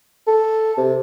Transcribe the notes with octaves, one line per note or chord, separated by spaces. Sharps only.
A4
C3